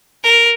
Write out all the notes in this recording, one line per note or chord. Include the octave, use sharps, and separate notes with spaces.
A#4